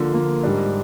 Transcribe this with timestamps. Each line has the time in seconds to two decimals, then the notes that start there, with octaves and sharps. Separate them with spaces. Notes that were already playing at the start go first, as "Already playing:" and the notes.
Already playing: D3 F3 A#3 F4
0.13 D3 F3 A#3 F4
0.43 G#2 G3 D4